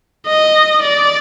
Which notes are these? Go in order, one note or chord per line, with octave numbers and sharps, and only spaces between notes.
D#5
D5